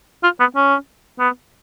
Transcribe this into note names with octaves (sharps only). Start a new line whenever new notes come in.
F4
B3
C#4
B3